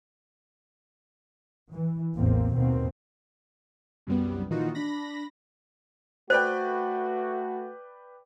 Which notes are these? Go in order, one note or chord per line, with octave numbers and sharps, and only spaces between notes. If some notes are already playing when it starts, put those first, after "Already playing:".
E3
A1 E2 A#3 C4
D#2 B2 A#3 C4
C2 F#2 G3 B3
A#2 D#3 E3 D#4 F4 F#4
D4 B5 A#6
A3 F#4 B4 C5 D5 G5